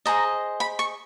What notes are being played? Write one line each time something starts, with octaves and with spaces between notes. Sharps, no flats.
G#4 C5 D#5 A#5
B5
C#6